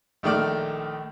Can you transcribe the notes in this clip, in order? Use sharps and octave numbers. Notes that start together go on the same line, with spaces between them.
A#1 D#3 A3 D5 F6